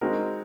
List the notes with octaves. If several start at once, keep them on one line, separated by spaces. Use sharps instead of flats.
G#3 C4 D#4 F#4 A#4